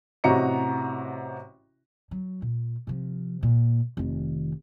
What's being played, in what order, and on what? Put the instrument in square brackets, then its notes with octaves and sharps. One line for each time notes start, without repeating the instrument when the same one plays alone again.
[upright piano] A1 C3 F#4 D#5 A#5 C#7
[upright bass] F#3
A#2
C3 F3
A#2
F1 D#3